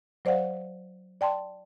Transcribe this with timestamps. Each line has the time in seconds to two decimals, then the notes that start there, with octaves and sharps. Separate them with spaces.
0.25 F#3 C5 D5 F5 F#5
1.21 D5 G5 A5 C6